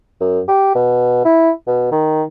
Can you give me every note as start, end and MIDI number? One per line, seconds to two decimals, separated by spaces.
0.21 0.41 42
0.48 0.71 67
0.75 1.23 47
1.25 1.51 64
1.67 1.88 47
1.92 2.23 51